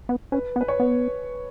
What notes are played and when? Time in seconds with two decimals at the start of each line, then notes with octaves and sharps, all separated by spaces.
0.09 B3
0.32 C#4 B4
0.56 B3
0.61 B4
0.68 C#5
0.80 B3